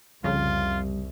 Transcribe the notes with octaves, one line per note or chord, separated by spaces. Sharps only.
C2 F2 C#3 G3 F4